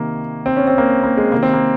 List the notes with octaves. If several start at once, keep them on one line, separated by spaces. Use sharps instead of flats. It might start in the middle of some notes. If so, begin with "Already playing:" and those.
Already playing: C3 D#3 A#3
C4
C#4
C4
A#3
A#3
G#3
C3 D#3 A#3
C4
A#3